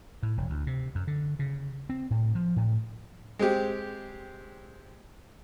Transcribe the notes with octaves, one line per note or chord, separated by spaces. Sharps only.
A2
E1
D2
C3
F#2
D3
C#3
C4
A2
F3
A2
G#3 C4 G4